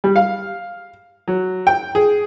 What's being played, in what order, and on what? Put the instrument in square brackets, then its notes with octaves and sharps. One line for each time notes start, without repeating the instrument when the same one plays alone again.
[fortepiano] G3
F5
F#3
G5
G#4